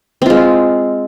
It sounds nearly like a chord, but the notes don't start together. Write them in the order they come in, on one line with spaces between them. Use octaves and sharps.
C4 F4 G#3